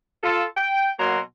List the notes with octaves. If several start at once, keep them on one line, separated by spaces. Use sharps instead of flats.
F4 A4
G5
B2 F#3 A#3 A#5 C6